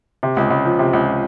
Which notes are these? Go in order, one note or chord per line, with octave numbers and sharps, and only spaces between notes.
C3
C#2
C#2
F3
C3
C#2